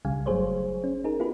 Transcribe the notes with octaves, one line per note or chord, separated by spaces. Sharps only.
C2 C#3 G3 F5 G#5
G1 F#3 A3 G#4 C5 C#5
C#4
D#4 G#4 A#4
B3 E4 F4 G4 B4